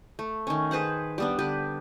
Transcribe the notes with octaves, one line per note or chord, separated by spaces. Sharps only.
A3
D#3 C#4
G#4 B4 C5 F#5
G3 B3 D4
D3 G4 B4